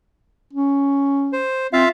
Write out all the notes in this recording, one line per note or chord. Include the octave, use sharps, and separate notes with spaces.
C#4
C5
C4 F4 E5 F5